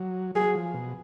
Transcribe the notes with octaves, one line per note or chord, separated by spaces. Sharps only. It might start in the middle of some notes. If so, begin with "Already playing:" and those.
Already playing: F#3
F#3 G#4
F3
B2